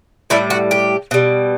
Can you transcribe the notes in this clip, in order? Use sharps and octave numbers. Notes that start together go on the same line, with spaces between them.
A2 G3 E4
F#4
G4
B2 G3